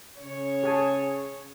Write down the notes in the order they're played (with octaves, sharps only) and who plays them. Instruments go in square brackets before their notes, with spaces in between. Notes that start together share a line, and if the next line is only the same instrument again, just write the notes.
[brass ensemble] C#3 C#5
[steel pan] G#4 G#5 A5